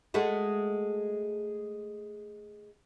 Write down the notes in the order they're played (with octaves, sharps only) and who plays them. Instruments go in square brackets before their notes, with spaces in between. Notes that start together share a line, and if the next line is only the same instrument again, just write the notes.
[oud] G#3 A3 F#4